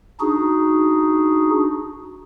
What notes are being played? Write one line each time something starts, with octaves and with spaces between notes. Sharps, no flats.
D4 D#4 F#4 G#4